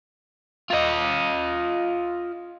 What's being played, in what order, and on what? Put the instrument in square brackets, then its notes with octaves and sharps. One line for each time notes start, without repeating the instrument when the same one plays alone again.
[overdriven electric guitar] F4 D#5